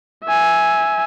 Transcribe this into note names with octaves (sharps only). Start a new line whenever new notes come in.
E5 G#5